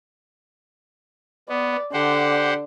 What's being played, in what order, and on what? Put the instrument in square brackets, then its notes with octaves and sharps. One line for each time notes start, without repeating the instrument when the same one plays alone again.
[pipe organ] B3 [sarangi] D5
[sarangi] D3 [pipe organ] G4 C5 F#5